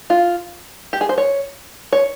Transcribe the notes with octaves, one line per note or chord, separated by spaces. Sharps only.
F4
G4
G#4
C5
C#5
C#5